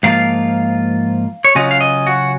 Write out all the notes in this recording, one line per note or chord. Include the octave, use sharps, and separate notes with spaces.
G#2 F3 A#3 F4 F5
C#5
C#3 F#3 C#4 F4 D#5
F5
D#5
F#4